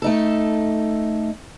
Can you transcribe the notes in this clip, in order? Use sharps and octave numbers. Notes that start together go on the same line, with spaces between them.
A3 D#4 A4